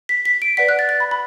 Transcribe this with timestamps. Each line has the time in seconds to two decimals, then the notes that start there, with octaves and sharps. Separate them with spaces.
0.09 B6
0.25 B6
0.42 D7
0.57 B4 D5 F#5 B6
0.69 F#6
0.79 A6
0.89 A6
1.00 B5
1.11 B5